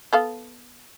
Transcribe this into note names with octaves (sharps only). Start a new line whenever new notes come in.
B3 A4 F5